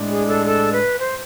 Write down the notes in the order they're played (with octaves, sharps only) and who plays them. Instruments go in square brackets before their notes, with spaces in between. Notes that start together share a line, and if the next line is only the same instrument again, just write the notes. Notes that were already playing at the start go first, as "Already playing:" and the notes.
Already playing: [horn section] A2 G#3 D4
[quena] G#4
A4
A4
B4
C5